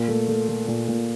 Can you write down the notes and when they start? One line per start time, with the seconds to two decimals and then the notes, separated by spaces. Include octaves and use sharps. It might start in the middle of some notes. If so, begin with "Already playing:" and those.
Already playing: A#2
0.08 A3
0.28 A3
0.49 A3
0.68 A#2
0.88 A#2